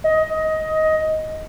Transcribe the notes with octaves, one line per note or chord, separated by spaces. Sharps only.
D#5